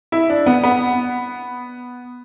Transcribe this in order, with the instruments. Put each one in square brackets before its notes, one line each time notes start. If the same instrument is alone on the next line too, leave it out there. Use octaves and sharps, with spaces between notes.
[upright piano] E4
D4
B3
B3